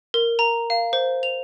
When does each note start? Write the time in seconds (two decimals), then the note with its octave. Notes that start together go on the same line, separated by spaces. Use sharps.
0.14 A#4
0.39 A#5
0.70 F5
0.93 C5
1.23 F7